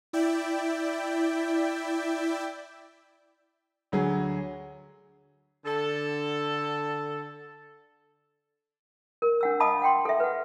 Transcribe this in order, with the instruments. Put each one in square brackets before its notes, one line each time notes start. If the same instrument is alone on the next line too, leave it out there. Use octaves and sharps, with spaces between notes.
[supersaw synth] E4 D5 E5 G5
[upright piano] D2 F#3 G#4
[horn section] D3 A4
[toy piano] A#4
D4 F#5 E6
D#5 F5 A5 B5 D6 D#6
F#5 G5 C6
A4 E5
B4 F#5